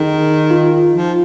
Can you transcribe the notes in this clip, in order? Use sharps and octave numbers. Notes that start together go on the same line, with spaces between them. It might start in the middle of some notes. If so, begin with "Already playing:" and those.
Already playing: D#3 G#4
F4
F3